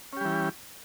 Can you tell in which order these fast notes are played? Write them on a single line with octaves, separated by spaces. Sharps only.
C#4 G4 G3 E3